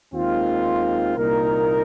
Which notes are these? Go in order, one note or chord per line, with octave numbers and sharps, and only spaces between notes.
D#2 D#3 G#3 C4 F4
C2 A#2 A#3 D#4 A#4